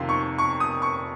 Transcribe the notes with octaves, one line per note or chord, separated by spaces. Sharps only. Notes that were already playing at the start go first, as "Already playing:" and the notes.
Already playing: F2 C3 D#3 A#3 C6
C#6
C#6
D#6
C#6